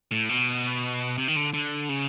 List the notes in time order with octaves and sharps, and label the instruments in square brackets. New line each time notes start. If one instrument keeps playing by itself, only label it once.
[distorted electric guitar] A2
B2
C3
D#3
D3
D3
C#3